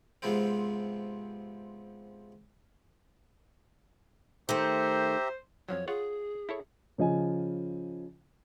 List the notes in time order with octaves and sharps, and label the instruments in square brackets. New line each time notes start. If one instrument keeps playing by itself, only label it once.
[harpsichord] G#2 C3 F3 G#3 B3 C4
[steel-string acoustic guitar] D#3 A3 [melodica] G4 E5 A#5 [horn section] C5
[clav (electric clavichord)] F2 F3 F#3 [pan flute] C#5
[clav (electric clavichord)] F4 C#5 F#5 [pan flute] G#4
[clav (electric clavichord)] E4 A4 C#5
[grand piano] C#3 F3 D#5 G#5